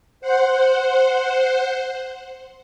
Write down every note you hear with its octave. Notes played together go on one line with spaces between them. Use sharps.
C5 F#5